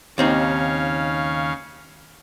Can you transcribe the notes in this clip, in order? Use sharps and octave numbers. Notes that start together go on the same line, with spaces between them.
D#2 C#3 C4 D#4 C#5 F5